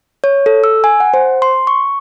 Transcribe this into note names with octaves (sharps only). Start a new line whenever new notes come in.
C#5
A4
E6
G#5
F#5
C5
C6
C#6